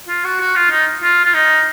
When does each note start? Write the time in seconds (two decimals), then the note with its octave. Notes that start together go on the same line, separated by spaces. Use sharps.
0.08 F4
0.25 F#4
0.40 F#4
0.56 F4
0.71 D#4
1.03 F4
1.25 F4
1.34 D#4